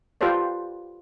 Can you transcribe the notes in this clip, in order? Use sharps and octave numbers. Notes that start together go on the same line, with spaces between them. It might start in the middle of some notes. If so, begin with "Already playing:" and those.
F4 G4 A4 B4 C5 D5